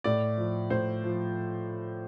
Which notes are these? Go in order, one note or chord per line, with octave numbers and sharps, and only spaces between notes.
A2 D5
F3
A2 C5
F3